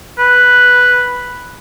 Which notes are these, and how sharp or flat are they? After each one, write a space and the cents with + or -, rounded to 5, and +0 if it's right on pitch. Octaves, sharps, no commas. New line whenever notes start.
B4 +0